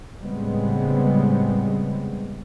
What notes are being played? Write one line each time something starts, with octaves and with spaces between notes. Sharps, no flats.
A2 C#3 G3 G#3 B3 C4